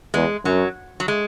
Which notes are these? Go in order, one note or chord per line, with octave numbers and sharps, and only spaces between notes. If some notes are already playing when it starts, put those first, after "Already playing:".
E2 G#3
F#2 F#3
F#3
G#3